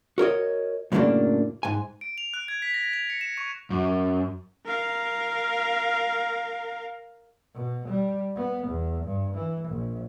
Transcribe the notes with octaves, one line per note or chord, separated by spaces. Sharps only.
F#4 A#4 C#5 D#5
F#2 A2 C#3 F#3 A#3 D4
G#2 G#5
D7
F7
F#6
G#6
B6
A#6
F7
C#7
E7
C#6
F#2
A#4 F5
B2
G3
B3
E2
G2
E3
A#1